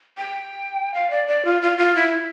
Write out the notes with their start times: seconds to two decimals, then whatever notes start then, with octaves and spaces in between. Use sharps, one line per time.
0.18 G5
0.94 F5
1.11 D5
1.28 D5
1.45 F4
1.62 F4
1.78 F4
1.95 E4